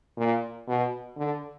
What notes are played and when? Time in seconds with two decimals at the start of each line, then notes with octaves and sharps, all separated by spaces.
0.18 A#2
0.68 B2
1.17 D3